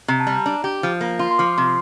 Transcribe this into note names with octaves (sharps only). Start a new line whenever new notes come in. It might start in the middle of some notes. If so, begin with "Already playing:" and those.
C3 A#5
A5
G3
A#5
D4
G4
F3
A#3
F4 C6
C6
F3 D6
C3 C6